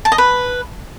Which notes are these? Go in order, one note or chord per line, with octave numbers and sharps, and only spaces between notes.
A5
D#5
B4